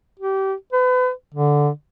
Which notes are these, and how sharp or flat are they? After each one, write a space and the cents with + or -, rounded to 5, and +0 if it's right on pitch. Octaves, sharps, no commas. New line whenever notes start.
G4 -25
B4 +35
D3 -5